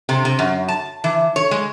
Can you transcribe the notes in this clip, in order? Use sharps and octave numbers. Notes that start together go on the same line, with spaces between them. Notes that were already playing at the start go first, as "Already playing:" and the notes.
C3
C3
F#2
A5
E3
C#5
G#3